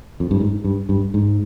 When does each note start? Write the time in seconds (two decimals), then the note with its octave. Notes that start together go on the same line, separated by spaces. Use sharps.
0.20 F2
0.31 G2
0.40 G#2
0.64 G2
0.89 G2
1.14 G#2